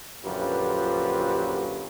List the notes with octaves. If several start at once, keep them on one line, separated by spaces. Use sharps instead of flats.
A#1 F#2 D3 F4 G4 B4